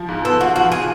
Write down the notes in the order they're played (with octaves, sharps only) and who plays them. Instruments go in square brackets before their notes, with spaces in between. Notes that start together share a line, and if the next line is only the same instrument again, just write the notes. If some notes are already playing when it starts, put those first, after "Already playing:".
Already playing: [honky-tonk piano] F3
G#2
[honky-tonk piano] B3 [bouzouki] A4
[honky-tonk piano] F4 [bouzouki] F#4
[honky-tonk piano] F3 [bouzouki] F#4
[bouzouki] G#4